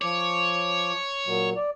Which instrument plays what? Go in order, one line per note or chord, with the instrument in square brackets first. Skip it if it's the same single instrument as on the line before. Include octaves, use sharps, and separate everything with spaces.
[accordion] F3 D6 [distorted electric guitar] C#5
[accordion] A#2 F#3
D5